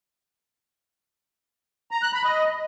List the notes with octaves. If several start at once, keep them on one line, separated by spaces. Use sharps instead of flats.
A#5
F#6
B5
D#5